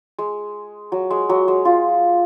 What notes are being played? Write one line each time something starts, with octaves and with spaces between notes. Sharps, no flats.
G#3
F#3
G#3
F#3
G#3
F4